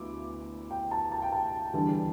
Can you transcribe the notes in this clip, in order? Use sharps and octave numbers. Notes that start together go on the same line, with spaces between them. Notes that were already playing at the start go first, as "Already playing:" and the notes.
Already playing: D2 B3 E4 D6
G5
A5
A5
G5
A5
E2 D3 G3 D4